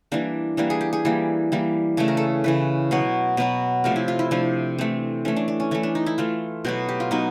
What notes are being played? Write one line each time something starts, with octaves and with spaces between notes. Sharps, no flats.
E3 G3 A#3 D4
E3 G3 A#3 D4
G#4
G4
G#4
E3 G3 A#3
E3 G3 A#3
C#3 E3 A3 A4
A#4
A4
C#3 E3 A3 B4
B2 F#3 B3 C#5
B2 F#3 B3 B4
C3 F3 A3 A#4
E4
F4
E4
C3 F3 A3 D4
E3 A3 C4
E3 A3 C#4
D4
D4
C#4
E3 A3 C#4
D4
D#4
E4
E3 A3 F4
B2 F#3 B3 G4
G4
F4
B2 F#3 B3 D#4